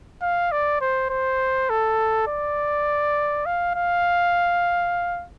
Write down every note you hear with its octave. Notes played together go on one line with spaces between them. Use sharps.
F5
D5
C5
C5
A4
D5
F5
F5